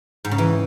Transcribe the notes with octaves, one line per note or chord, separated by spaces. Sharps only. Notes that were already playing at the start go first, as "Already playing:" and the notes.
G#2
C#3
E3